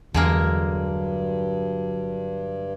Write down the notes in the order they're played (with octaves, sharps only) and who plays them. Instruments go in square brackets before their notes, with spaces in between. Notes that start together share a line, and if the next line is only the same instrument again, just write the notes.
[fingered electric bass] E2 [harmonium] G2 [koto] D3 G#3 A#3 [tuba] F#3